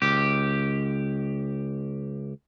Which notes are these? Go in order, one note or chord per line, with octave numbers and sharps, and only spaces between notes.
C#2 G4